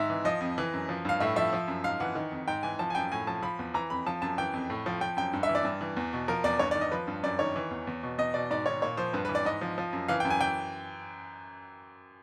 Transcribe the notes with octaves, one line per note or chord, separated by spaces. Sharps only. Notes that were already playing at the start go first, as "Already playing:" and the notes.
Already playing: G#2 D#3 E5
E3
F3 D#5
F2
E3
F#2
F3
G2 F5
A2 E5
F3 E5
F3
F#2
G#2 F5
E3 F#5
D#3
F2
G#2 G5
E3 G#5
F3 A5
G#5
F#2 G5
A2 G#5
F3 A5
F3 B5
E2
E3 A#5
F2 B5
F3 A5
F#2 A5
E3 G5
F2
A2
F3
F3 G5
F#2 G5
G2
E5
E3
D5
G2
E3
E2
B2
F3 A#4
E2 D5
G2 C#5
D5
D#3
D#5
F3 B4
G2
F#2 D5
D#3 C#5
E3
E2
E2
B2
E2 D#5
B2 D5
G#2 D5
D#3 C#5
A#2 C#5
F3 C5
G2 B4
B4
E3
D5
G#2 D#5
F3
F3
F#2
E3 F5
G5
F#2
G#5
E3 G5